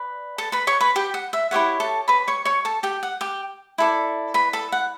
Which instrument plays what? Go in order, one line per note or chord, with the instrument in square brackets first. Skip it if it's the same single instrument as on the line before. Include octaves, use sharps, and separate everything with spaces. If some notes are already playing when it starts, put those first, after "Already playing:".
Already playing: [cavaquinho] B4 D5
A4 A5
B4 B5
C#5 C#6
B4 B5
G4 G5
F#5
E5
E4 G4 C#5 F#5
A4 A5
B4 B5
C#5 C#6
C#5 C#6
A4 A5
G4 G5
F#5
G4 G5
E4 A4 D5
B4 B5
A4 A5
F#5